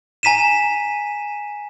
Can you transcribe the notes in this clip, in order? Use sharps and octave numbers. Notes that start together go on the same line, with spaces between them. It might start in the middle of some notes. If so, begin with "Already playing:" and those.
G#5 A#5 B6 D#7 E7